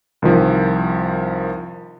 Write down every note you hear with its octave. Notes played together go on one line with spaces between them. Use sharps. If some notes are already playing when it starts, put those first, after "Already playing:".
C2 D#3 F3